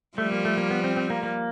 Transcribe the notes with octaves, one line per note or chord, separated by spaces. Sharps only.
F3 G3 A3
A#3
A3
A#3
B3
C4
C4
A#3
A#3